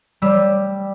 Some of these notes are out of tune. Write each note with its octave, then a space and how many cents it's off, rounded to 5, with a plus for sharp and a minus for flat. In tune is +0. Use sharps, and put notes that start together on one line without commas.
G3 +0 E6 +0